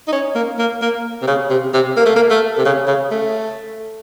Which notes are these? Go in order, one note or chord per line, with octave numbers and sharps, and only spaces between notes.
D#4
C#4
A#3
A#3
A#3
C3
C#3
C3
C3
A#3
A3
A#3
A3
C3
C#3
C#3
A3